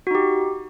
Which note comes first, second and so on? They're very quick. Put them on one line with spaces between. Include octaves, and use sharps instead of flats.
F#4 D#4 G4